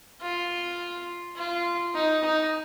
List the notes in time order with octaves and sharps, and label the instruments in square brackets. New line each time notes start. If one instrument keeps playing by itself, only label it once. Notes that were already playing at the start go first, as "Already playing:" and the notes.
[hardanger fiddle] F4
F4
D#4
D#4